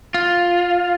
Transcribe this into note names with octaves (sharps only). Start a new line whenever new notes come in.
F4